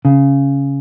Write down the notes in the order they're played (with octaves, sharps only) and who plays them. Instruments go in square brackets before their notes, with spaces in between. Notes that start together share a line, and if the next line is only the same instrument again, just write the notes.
[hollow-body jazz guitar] C#3